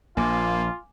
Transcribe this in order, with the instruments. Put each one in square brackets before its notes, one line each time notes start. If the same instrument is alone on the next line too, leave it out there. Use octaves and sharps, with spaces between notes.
[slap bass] A#1 [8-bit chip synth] A#3 [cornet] F4 [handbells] G#5 D6